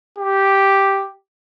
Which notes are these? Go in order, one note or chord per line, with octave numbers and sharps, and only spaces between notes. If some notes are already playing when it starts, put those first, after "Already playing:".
G4